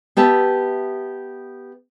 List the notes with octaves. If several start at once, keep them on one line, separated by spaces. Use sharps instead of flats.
B3 G4 E5 A5